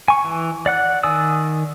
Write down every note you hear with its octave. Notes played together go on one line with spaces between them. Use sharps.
G#5 C#6
E3
D5 F#5 F#6
D#3 D5 G#5 D#6 E6